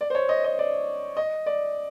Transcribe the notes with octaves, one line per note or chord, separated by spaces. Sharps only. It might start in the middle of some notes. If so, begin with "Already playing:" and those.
D5
C5
C#5
D#5
D#5
D5
D#5
D5